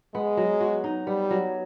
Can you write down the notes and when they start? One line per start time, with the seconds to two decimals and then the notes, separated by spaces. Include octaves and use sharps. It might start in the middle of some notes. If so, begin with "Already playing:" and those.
0.15 G#3 B3
0.37 F#3
0.61 F#4
0.84 D#4
1.07 G3 B3
1.31 F#3